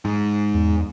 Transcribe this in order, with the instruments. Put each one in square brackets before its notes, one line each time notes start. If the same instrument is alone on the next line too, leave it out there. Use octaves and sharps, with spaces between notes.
[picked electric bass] G#2
[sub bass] E2